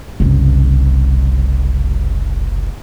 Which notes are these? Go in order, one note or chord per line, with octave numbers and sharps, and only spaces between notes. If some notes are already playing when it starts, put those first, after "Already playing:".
F#1 C2